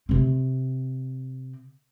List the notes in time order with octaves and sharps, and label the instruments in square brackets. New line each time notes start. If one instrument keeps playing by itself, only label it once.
[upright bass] C3 C4